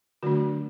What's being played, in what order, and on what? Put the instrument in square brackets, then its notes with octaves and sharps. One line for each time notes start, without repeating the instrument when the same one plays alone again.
[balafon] D3 F#3 A3 D4 F#4